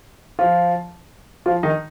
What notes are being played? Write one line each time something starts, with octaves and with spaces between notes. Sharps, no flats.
F3 F4
F3 F4
D#3 D#4